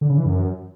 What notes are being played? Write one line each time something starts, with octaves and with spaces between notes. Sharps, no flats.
D3
C#3
E3
F#2